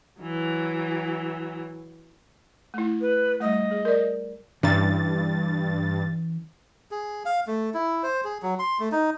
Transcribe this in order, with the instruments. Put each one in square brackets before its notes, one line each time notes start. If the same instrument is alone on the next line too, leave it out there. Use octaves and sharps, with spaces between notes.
[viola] E3 F#3
[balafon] A3 E4
[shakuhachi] B4
[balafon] G3 A3 [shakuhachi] D#5
[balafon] G#4
A#4 D5
[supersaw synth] G2 A6 [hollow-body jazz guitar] E3 C#4 A#5
[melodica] G#4
F5
A3
E4
C5
G#4
F#3
C6
A3
D#4